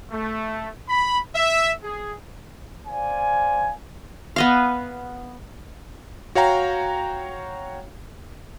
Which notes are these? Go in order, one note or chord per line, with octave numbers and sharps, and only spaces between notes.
A3
B5
E5
G#4
C5 D5 F5 G#5
B3 D#5 F5
F#4 C#5 F5 G5 A#5